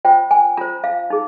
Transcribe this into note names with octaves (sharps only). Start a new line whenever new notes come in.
F4 C5 G5
G#5
F4 C5 A#5
F5
D#4 G#4